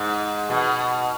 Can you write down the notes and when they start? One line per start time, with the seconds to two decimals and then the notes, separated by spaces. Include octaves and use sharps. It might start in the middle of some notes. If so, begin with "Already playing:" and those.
Already playing: G#2
0.50 B2